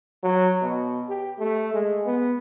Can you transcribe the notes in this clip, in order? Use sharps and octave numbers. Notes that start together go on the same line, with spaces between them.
F#3
B2
G4
A3
G#3
B3